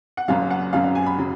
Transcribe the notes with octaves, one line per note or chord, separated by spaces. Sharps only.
F#5
F#1 F#2 C#3 F#3 F5
F#5
F#1 F#2 C#3 F#3 F5
F5
G#5
B5
C#3 F#3